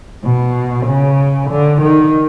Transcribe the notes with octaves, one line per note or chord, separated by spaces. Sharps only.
B2
C#3
D3
D#3